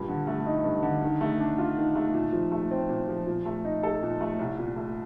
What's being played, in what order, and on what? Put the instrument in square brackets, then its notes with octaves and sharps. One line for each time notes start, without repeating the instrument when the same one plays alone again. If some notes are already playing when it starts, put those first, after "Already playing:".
Already playing: [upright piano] G2 A#2
D3
A3
D#4
G2
D3
D#3
A3
D4
F4
D#3
A3
A#2
F3
A3
C4
A#2
F3
A#2
A3
D#4
A4
A#2
A3
C2
A#2
A3